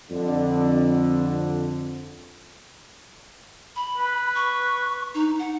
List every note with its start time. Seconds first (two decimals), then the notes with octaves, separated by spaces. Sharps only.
0.11 F2 D3
3.76 B5
3.98 B4
4.35 C#6
5.14 D#4
5.39 F#5